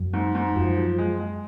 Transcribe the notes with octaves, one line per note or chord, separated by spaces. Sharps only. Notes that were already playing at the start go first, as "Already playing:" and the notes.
Already playing: F#2
G#2
G#2
F#2 F3
F3
G#3
G#3